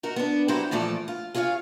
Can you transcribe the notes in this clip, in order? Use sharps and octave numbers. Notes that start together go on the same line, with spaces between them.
D#4 F#4 A#4
B3 D4
F#3 G3 E4 F#4 C5
A#2 E3 F3 A3 D5
F4
F4 G#4 C#5 D#5 F5